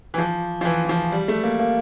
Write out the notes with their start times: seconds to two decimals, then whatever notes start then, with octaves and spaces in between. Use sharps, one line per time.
0.14 E3
0.18 F3
0.61 F3
0.65 E3
0.84 E3
0.89 F3
1.12 G3
1.28 A3
1.43 A#3
1.59 A#3